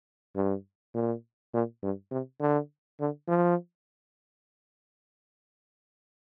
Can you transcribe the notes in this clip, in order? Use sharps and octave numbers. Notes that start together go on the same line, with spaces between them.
G2
A#2
A#2
G2
C3
D3
D3
F3